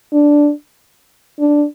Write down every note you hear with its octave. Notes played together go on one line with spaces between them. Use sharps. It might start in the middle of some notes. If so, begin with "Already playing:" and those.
D4
D4